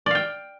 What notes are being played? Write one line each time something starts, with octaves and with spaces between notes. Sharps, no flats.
D5 F5 G5